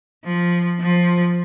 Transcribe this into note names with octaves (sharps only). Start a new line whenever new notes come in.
F3
F3